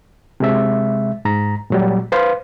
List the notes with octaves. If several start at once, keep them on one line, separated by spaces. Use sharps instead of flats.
C3 G#3 E5
G#2 A#5
A#2 F#3 G3
B4 C5 F5